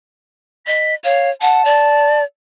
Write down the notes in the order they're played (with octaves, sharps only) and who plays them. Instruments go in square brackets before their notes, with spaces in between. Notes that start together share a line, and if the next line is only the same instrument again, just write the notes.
[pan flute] D#5 [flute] B6
[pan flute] C#5 [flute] F5
[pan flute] F#5 [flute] A5
[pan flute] D5